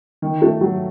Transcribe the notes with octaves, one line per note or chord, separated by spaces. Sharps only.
D#3
A3
F#3